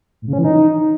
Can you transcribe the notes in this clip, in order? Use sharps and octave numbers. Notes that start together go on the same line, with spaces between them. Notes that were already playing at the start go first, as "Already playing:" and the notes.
A2
C#3
C#4
E3
D#4